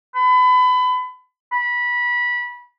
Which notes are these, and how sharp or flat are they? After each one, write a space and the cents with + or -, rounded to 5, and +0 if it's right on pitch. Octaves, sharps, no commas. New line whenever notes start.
B5 +30
B5 -25